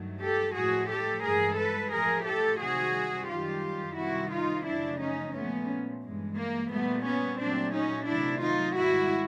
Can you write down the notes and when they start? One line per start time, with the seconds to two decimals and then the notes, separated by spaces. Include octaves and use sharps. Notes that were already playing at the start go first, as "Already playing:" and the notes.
Already playing: G2 D#3 F#3 A3
0.21 G4 A4
0.55 A2 F3 A3 F#4 G#4
0.89 G4 A4
1.23 G2 E3 G#3 G#4 A#4
1.58 A4 B4
1.92 A2 F3 A3 G#4 A#4
2.26 G4 A4
2.60 C3 D#3 G3 F#4 G#4
3.29 F#2 D#3 G3 F4 G4
3.97 C3 D#3 G3 E4 F#4
4.31 D#4 F4
4.65 F#2 C#3 F3 A3 D4 E4
5.00 C#4 D#4
5.33 A#2 F3 A3 B3 C#4
6.02 G2 E3 G#3
6.36 A#3
6.70 A#2 G3 A3 B3
7.05 B3 C#4
7.39 A#2 F#3 A3 C4 D4
7.73 C#4 D#4
8.07 C3 D#3 F#3 A3 D4 E4
8.41 D#4 F4
8.76 G#2 D#3 G3 E4 F#4